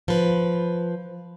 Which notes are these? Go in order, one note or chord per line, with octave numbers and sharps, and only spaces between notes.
F3 B4